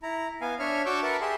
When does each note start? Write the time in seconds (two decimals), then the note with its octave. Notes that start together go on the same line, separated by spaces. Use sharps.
0.03 E4 A#5
0.41 B3 F5 G#5
0.59 D4 C#5 E5 F6
0.86 D4 F#4 C#6 D6 E6 G6
1.03 A#4 B4 E5 F#5 A5 B5
1.21 G4 G#4 E5 C6